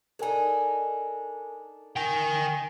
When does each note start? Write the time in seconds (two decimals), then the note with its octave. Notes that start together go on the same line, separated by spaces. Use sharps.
0.19 D4 D#4 A4 A#4 G#5
1.96 A#4 G5 G#5